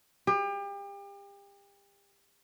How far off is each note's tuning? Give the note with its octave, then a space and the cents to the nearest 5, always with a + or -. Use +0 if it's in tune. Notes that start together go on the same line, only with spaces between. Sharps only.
G4 +35